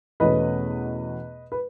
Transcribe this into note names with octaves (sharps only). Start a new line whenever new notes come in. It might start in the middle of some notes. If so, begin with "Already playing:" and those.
E2 B2 A3 C#4 B4 D#5
B4